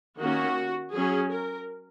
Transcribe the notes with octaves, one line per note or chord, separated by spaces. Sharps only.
D#3 A#3 C#4 F#4
F#3 C#4 G#4
A#4